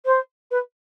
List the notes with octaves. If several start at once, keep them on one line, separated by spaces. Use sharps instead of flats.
C5
B4